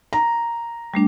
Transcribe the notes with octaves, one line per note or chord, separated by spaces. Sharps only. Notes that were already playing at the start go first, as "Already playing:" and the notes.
A#5
G3 A3 D4